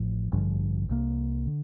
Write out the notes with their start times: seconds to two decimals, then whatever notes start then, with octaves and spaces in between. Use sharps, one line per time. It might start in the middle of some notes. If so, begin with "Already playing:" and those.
Already playing: A1 A2 F3
0.31 A1 G2 D3 F3
0.89 C2 C3 G3 A#3
1.47 D3